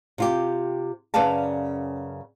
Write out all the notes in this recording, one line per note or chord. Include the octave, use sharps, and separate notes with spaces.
C3 F4 G4
F#2 C#3 B4 D5 F5 A5